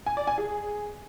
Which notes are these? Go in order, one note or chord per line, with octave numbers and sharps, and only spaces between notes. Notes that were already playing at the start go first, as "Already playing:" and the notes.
G#5
D5
G#5
G#4